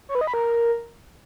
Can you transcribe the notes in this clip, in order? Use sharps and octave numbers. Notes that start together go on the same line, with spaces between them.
C#5
B4
D#5
B5
A#4